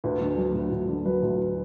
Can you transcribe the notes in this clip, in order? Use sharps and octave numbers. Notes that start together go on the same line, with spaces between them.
D2 B4
D3
F#3
D2
D2
D3
F#3 B4
D2